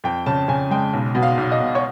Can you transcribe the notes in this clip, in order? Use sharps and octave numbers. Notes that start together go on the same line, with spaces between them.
F2 G5
C#3 A5
C#3 G#5
G#3 G5
B1
B2
F5
B1
D#5
B1
C#5